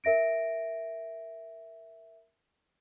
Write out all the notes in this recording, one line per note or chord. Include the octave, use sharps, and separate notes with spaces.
A#4 E5 A#6 D7